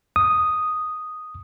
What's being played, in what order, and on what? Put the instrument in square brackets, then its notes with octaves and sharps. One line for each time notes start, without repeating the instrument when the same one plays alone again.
[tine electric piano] D#6